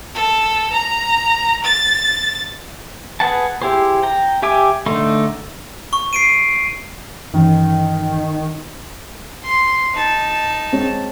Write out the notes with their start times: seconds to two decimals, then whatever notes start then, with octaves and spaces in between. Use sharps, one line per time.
0.14 A4
0.72 A#5
1.64 A6
3.20 G#4 B4 F#5 A5
3.62 E4 G4 G#4 C5
4.03 G5 A#5
4.42 G4 E5 G#5 D6
4.86 D3 A3 D#4 C6
5.93 C#6
6.13 C7 D7 D#7
7.34 G2 D#3 E3 C#4
9.44 C6
9.94 D#4 A5
10.72 G#3 C4 C#5